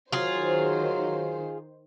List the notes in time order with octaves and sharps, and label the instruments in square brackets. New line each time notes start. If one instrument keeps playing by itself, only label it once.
[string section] D#3 C5 [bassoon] F#3 [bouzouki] F4 G#4